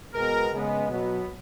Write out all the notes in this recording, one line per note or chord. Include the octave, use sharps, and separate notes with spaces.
B2 G#3 B3 A#4
C#3 G#3 B3
B2 F#3 B3